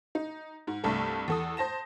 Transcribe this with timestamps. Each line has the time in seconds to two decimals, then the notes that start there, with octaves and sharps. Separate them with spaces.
0.15 D#4
0.67 G#2
0.84 C2 G2 A3 A4
1.28 E2 A4 D#6
1.57 C5 A5 A#6 E7